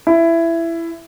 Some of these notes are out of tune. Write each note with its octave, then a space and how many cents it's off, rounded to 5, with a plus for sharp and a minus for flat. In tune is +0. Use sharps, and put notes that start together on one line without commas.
E4 +15